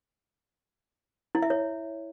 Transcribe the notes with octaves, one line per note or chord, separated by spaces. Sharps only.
E4
E5
C#5